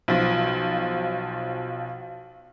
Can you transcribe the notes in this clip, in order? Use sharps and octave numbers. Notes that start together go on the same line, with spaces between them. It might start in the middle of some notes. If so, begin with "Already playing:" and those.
B1 F3